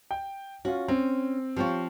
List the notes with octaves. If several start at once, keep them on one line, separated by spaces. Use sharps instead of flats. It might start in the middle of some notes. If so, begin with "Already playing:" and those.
G5
C#4 F4 F#4
C4 C#4
F3 C4 F4 G4 C#5 C#6